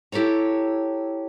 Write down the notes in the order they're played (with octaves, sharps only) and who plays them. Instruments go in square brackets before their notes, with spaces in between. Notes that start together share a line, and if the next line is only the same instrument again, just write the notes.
[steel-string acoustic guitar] E4 G4 A4 C#5 A#5